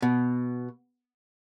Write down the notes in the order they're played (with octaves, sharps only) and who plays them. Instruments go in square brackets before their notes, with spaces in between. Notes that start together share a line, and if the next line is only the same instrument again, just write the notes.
[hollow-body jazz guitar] B2